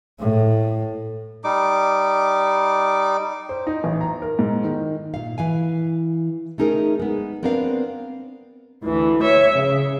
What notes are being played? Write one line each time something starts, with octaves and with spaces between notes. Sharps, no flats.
A2
G3 D#4 D6
C5
D#4
A1
A#5
A#4
G#2
D#3
A#2 F5
E3 F5 G#5
A3 C#4 D#4 G#4 A#4
G#3 B3
B3 C4 D4 A#4 D5 F5
D2 E3
C#5 E5
C#3